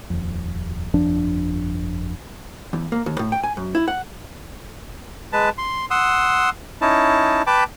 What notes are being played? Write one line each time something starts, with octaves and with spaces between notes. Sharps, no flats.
D#1 F2
G1 F2 F3 D4
E2
A#3
D#2
A2
G5
G#5
F#2
E4
F#5
G#3 B4 A5
C6
F#5 C6 D#6 E6
C#4 D#4 E4 A5
B4 G5 A5 B5 D6